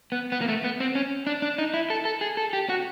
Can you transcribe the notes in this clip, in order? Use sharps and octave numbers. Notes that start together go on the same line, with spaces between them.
B3
B3
A#3
A3
B3
C4
C#4
D4
D4
D#4
E4
A4
A4
G#4
A4
G4
F#4